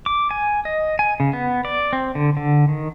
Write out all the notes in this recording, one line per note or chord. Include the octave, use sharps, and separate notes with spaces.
D6
G#5
D#5
G#5
C#3
B3
D5
C4
D3
D3
D#3